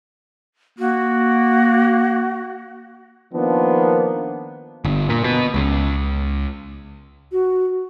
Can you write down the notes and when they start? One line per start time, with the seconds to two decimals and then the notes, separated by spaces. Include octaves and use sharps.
0.79 A#3 F#4
3.34 D#3 F3 A#3 B3 D4 F4
4.85 G1
5.09 A#2
5.24 B2
5.54 C#2
7.32 F#4